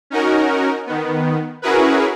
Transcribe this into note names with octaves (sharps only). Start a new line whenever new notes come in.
C#4 D#4 F#4 A#4
D#3 B3
C#4 E4 F#4 G#4 A#4 B4